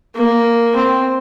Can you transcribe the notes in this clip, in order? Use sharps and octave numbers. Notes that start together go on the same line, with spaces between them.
A#3
C4